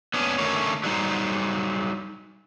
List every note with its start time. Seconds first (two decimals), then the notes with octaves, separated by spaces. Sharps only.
0.14 B3 C#4 D4
0.38 D3 D#3 A3 C#4 A#4 C#5
0.84 F#3 G3 D#4 C5